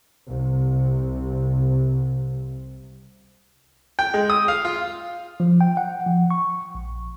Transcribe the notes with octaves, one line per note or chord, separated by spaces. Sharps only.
C2 C3
G5
G#3
D#6
F5
F4
F3
G5
F#5
F3
C#6
A#1